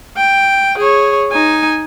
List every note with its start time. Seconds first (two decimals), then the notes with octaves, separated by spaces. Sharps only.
0.17 G5
0.78 G#4 C#5
1.32 D#4 G#5